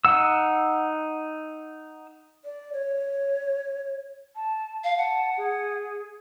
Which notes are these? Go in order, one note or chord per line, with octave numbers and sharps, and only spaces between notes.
D#4 F#5 E6
D5
C#5
A5
F5
F#5 A5
G#4